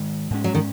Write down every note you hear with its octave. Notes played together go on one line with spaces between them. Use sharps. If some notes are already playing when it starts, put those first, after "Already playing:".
Already playing: G#2 D#3 G#3
G#2 G#3 C#4
F#3
D#3